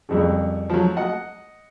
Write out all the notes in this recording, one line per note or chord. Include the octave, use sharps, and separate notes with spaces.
C2 F2 C#3
F3 F#3
D#5 F#5